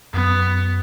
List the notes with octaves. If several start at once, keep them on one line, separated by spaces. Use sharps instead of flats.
F#2 F#3 B3